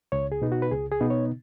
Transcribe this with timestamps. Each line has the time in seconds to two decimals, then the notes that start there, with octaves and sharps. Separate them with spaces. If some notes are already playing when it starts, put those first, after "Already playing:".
0.12 C#2 C#5
0.32 G#4
0.42 B2 B3 D#4
0.52 F#4
0.62 B4
0.71 C#2 G#4
0.91 G#4
1.01 B2 B3 D#4
1.10 C#5